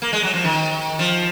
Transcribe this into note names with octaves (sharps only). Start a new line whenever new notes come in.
A#3
G#3
F#3
F3
D#3
F3